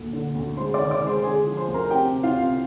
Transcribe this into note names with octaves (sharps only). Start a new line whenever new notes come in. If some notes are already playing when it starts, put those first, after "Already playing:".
Already playing: D2 A#2
D3
D2
G#3 C5 C6
D5 D6
D#3
D5 D6
G#3
C5 C6
D3 G#4 G#5
F3
C5 C6
D2
A#4 A#5
C4 G4 G5
C3
F4 F5
C2